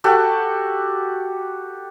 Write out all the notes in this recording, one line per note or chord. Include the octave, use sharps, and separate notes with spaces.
F#4 G4 A4 F#5